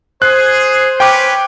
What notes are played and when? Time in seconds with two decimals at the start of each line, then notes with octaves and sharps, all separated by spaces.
0.22 G#4 C5 F#6
1.00 C#4 B4 G5 D6